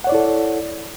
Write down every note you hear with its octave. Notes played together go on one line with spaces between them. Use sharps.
E4 A4 C#5 D5 F#5